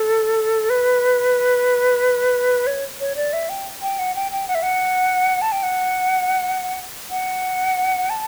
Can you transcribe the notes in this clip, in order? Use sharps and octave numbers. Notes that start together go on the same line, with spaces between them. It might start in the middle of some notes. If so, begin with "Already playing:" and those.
Already playing: A4
B4
C#5
C#5
D5
E5
G5
G5
F#5
G5
G5
F#5
E5
F#5
A5
G5
F#5
F#5
A5